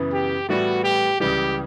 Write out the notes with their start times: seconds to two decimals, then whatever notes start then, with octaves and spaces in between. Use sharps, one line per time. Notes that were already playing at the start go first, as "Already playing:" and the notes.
Already playing: F#2 C#3 E3 B3
0.12 G4
0.48 A2 E3 G3 B3 E4 F#4
0.83 G4
1.20 C#2 C#3 E3 G3 G4